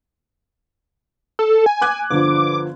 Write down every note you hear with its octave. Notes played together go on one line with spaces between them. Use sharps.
A4
G#5
D6 F#6 G#6
G1 D3 F3 D6